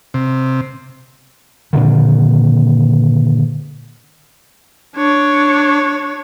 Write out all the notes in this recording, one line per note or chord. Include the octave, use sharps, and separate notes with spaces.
C3
G2 A#2 D3 D#3
D4 C#5